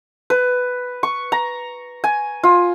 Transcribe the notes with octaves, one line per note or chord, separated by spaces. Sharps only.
B4
C#6
A#5
G#5
F4